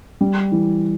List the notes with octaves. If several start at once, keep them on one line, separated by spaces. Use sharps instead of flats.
G3
E3